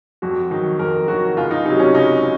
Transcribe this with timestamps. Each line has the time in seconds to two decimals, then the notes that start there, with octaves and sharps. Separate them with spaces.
0.22 F2 F#4
0.51 D#3 F#3 D#4
0.79 F2 A#4
1.08 D#3 F#3 F#4
1.37 C#2 F4
1.51 D#4
1.65 C3 F#3 D#4
1.80 C#4
1.94 C#2 D#4